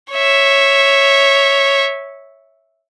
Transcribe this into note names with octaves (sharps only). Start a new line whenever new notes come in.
C#5 E5